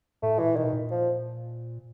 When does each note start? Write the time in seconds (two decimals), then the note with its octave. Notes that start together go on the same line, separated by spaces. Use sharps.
0.23 A2 A3
0.39 A#2 E3
0.56 B2 D#3
0.73 A#2
0.91 F3